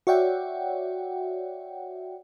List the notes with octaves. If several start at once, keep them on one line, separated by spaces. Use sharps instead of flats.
F#4 C#5 D5 E5 F#5 G5